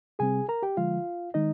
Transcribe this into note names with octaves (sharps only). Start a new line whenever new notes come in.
C3 G3 C4 G#4 G#5
A#4 A#5
G4 G5
D3 F3 G#3 F4 F5
D#3 G#3 D#4 D#5